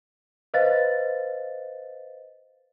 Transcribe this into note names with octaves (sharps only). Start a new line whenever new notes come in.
B4 C5 D#5 F5 A6